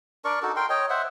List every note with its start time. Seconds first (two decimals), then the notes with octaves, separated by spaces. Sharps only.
0.25 D4 A#4 D5 C#6
0.42 D#4 F#4 A4
0.56 A#4 G5 C6
0.69 C#5 D#5 G5
0.90 C5 E5 F#5